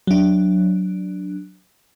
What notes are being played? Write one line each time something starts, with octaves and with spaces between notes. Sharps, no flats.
F#3 D4